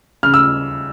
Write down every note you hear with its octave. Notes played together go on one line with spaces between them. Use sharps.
C#3 F6
E6